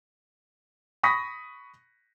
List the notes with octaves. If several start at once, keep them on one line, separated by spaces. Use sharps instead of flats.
B5 C#6 D#6 A#6 B6